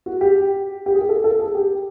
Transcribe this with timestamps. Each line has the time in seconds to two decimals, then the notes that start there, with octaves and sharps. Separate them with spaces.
0.06 F#4
0.21 G4
0.86 G4
0.95 G#4
1.09 A4
1.24 A4
1.39 G#4
1.55 G4